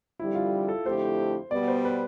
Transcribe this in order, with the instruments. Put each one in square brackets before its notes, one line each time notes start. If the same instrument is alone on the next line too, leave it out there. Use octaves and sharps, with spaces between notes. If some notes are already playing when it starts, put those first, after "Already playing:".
[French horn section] F2 D3 G3 [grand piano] E4
[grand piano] F4
A4
[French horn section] F2 D3 A3 E4 G4 [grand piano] C5
[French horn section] B2 G3 B3 [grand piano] D5
[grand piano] C5
B4